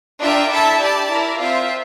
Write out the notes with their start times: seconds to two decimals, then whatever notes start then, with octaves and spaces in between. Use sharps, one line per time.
0.20 D4 F4 A#4 E5 G5
0.50 E4 A4 E5 A5
0.80 G4 D5 A5
1.09 E4 A#4 D5
1.39 C4 F4 C5 E5